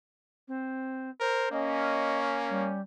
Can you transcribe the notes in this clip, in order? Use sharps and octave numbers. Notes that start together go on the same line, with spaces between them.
C4
A#4 C5
A#3 C#4 D#5
G3